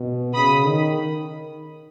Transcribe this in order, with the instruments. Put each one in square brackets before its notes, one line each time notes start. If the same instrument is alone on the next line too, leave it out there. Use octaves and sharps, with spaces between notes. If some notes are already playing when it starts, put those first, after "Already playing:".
Already playing: [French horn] B2
[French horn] C#3 [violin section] B5 D#6
[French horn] D#3